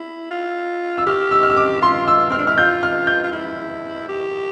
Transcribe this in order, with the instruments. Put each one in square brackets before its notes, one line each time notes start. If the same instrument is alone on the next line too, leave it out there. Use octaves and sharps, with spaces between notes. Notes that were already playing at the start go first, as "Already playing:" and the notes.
Already playing: [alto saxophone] E4
F4
[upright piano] E6
[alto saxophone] G4 [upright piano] F6
[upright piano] E6
F6
E6
D6
[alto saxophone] F4 [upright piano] C6
[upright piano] E6
[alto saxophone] C4 [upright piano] F6
[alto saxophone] D4
[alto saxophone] E4 [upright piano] F6
[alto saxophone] F4 [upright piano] G6
[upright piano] F6
G6
[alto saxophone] F4
E4
G4